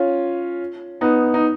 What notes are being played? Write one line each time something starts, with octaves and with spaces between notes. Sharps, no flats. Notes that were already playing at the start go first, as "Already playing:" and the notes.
Already playing: C#4 F4
B3 D#4
D#4